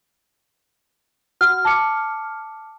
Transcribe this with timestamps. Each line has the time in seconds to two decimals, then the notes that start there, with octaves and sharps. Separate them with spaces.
1.41 F#4 F#5 F6
1.65 A5 D6 C#7